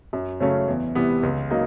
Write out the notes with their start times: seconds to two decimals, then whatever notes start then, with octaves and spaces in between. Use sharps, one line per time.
0.13 F#2
0.40 C#3 F#3 A3 C#4
0.68 E2
0.95 C3 E3 G3 B3
1.23 C#2
1.50 C#3 F#3 A#3 D#4